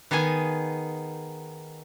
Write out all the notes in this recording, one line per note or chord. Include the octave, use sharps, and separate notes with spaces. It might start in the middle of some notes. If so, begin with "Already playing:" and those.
D#3 B3 D#4 G#4 G#5